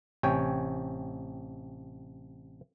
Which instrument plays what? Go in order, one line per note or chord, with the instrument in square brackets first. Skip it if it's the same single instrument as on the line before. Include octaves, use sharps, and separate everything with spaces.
[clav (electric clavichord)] A1 C3 C#5 G5 G#5